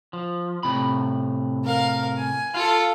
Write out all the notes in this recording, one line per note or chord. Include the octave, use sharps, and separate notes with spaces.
F3
A2 C3 B5
A#4 F5
G#5
F4 A4 F5